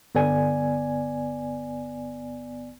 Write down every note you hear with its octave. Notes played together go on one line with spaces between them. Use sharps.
G1 B3 D5 G#5